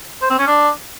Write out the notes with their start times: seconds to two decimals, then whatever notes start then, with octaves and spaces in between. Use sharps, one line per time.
0.22 C5
0.30 C4
0.39 C#4
0.47 D4